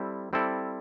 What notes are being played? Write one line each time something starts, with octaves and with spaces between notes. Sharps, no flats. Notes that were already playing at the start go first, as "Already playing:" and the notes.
Already playing: G3 C4 E4 A4
G3 C4 E4 A4 D5